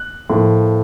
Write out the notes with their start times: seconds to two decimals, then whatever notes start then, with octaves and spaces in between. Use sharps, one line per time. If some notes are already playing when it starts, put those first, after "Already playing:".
Already playing: F#6
0.30 A2 F3 A#3